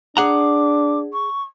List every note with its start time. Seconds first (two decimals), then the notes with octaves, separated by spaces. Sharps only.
0.17 D4 G#4 F#5 A#5 D6
1.12 C#6